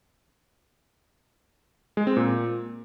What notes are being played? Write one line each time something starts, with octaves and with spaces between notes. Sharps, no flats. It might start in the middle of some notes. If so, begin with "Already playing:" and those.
G#3
C4
A#2